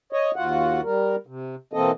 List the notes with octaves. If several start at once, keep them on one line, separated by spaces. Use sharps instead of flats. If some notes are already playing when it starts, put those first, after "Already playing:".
C#5 D#5
D#2 F4 F#4 F#5
G3 A#4
C3
B2 E3 A#3 C4 A4 D#5